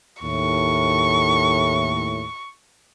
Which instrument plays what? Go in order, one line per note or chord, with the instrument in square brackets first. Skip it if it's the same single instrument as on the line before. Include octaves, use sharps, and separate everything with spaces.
[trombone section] D#2 A2 [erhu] C#6